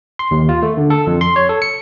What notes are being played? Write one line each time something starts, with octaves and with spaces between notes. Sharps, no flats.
C6
D#2
F4
A3
D3
A4
F2
C6
C#5
A4
C#7